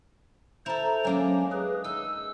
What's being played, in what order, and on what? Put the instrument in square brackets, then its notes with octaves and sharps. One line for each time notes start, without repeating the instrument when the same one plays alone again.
[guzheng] E4 A4 [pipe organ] C5 A#5
[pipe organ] F#3 C#4 [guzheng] G#3 A#3 D4
[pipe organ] G#4 B4
[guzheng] D#4 [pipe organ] E6